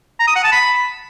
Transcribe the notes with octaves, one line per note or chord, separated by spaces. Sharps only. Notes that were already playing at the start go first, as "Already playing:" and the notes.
A#5
D#6
F#5
A5
B5